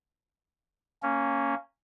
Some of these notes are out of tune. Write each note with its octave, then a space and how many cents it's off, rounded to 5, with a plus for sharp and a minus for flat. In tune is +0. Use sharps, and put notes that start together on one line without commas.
A#3 -15 C#4 +0